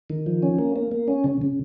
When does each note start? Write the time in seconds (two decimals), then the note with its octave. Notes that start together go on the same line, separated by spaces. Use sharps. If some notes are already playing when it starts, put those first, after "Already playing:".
0.10 D#3
0.26 F3
0.43 C#4
0.58 A#3
0.76 A#3
0.92 A#3
1.08 C#4
1.24 C#3
1.42 C#3